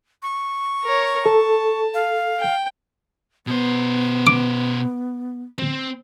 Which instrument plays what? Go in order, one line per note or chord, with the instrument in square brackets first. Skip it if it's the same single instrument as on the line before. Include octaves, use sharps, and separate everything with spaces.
[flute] C#6
[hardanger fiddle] A#4 C#5
[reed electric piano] A4 [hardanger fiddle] A5
[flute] F5
[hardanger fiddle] G5
[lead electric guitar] B2 C5 [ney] B3
[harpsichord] D6
[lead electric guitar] C4